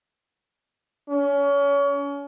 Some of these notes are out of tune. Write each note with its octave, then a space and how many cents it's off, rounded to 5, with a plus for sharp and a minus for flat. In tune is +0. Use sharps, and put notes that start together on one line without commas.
C#4 +30